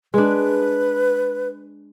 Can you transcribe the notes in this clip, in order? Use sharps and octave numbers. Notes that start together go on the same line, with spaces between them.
G#3 D4 B4